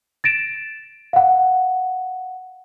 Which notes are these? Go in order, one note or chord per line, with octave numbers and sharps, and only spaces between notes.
A6 A#6 D7 E7
F5 F#5